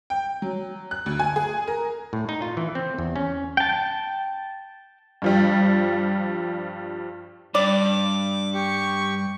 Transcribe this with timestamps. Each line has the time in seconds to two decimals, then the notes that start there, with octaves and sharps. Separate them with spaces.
0.10 G5
0.42 F#3
0.91 F#6
1.06 D2
1.20 G#5
1.36 G#4
1.68 A#4
2.13 A2
2.29 D#4
2.42 F4
2.57 E3
2.75 C4
2.98 E2
3.16 C#4
3.57 G5 A5
5.22 G2 F3 G3
7.55 G2 D5 D6
8.54 G4 C#6